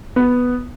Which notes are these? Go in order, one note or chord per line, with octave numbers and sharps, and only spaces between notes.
B3